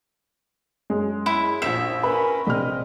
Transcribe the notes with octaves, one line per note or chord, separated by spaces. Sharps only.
F#2 G#3
E4
A#1 E5 E7
C#4 A#4 B4 B5
A#1 C3 C4 D#5 F6